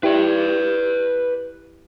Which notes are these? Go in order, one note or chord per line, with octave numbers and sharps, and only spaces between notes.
E4 G4 B4 D5